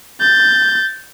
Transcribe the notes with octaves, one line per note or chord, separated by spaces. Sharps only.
G6 A6